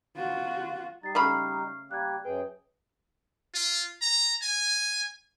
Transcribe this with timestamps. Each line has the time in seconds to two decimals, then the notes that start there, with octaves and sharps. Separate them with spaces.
0.17 F4 F#4
1.03 G3 D#4 A6 C7
1.15 C#3 A3 B5 C#6 F6 C7
1.91 G3 A#3 G4 F#6 G#6
2.25 F#2 G#4 B4 G5
3.55 F4
4.02 A#5
4.42 G#5